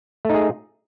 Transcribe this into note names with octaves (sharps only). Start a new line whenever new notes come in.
A3 D#4 G#4